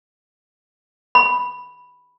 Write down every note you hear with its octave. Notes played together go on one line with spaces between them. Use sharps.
B5